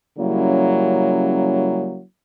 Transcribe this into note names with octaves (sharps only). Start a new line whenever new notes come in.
C#3 F#3 G3 A#3 C#4 E4